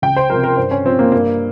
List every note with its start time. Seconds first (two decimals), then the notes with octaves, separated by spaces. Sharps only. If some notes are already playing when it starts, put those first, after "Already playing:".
0.02 C#2 G5
0.16 C5
0.30 C3 F3 A#4
0.44 A#4
0.57 G2 C5
0.71 C#4
0.85 F3 C4
0.99 A#3
1.12 G2 A#3